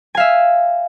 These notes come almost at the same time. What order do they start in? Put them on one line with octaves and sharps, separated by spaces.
G#5 F5 E5